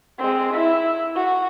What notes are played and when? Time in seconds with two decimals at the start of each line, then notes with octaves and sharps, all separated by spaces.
0.19 G#3 C4
0.54 E4
1.15 F#4